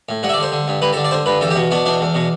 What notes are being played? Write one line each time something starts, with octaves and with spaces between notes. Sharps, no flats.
A2
G2 F#5
E5
D5
D3 C5
D3
G2
G2 B4
A4
D3
D5
D3 C5
G2 B4
E2 A4
G4
B2
B2 D4
E2 D4
E2
B2